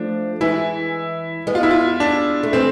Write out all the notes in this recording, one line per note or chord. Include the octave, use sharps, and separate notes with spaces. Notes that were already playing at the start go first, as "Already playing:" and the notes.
Already playing: F3 A3 D4
E3 G#3 E4
G#3 B3
F4
E4
F4
D4
A3
E3 G#3 C4